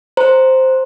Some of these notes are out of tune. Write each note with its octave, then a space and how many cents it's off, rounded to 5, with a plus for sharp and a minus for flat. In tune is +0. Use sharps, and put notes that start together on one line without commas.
C5 +0 A#5 +0